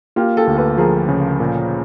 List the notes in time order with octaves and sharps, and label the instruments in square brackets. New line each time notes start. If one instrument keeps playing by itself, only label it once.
[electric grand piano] A#3 [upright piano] F4 G4
[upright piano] G4 A4
[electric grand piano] D2
[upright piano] A4 B4
[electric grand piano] F3 [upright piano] G#4 A#4
[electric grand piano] C#3
A#2